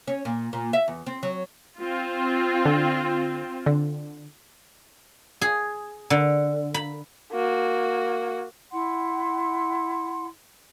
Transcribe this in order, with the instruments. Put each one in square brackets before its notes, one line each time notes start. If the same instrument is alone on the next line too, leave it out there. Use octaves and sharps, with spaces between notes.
[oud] C#4
A#2
A#2
E5
E2
C4
F#3
[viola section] C4 F4
[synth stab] D3
D3
[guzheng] G#4
D3
B5
[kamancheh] A#3 F#4
[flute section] E4 F#5 C6